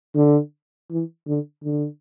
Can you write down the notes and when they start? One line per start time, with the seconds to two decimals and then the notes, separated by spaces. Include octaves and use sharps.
0.16 D3
0.91 E3
1.27 D3
1.64 D3